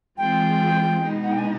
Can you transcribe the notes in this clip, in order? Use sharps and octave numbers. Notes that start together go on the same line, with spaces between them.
E3 G#3 C4 F4 G#4 G5
B2 G#3 B3 D#4
F#5
G5
G#5